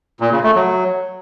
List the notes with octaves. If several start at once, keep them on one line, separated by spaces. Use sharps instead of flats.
A#2
C#3
A3
F#3